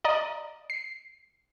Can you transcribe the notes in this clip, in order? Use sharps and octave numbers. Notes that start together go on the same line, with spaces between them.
D5 D#5 A#5
C7